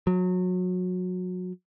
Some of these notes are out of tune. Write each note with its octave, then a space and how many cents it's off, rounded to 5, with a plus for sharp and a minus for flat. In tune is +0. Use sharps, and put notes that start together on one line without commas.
F#3 -25